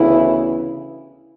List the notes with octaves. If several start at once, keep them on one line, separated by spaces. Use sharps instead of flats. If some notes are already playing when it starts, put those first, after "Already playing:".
Already playing: D2 C#3 E3 B3 E4